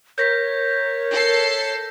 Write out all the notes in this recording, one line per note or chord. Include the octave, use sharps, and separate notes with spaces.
A#4 C#5 G6 A#6 B6
A4 C7